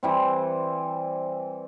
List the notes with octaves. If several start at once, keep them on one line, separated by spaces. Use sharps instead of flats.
E3 G3 C4